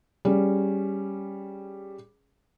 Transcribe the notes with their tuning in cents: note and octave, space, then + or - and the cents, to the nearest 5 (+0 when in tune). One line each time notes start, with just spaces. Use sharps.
G3 +0 C#4 +0 G#4 +0